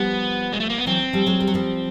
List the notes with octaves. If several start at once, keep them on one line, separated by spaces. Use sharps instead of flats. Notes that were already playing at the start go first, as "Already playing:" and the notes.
Already playing: F3 G3 B3
G#3
A3
A#3
B3
E3 F#3 C4
F3 G3
F#3 G#3
G3
F#3
F3 G3